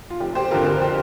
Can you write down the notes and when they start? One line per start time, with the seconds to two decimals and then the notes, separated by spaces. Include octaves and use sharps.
0.10 F4
0.20 F1 G4
0.35 G4 C5
0.51 F2 F4 A#4
0.54 D3
0.66 G4 C5
0.81 G4 C5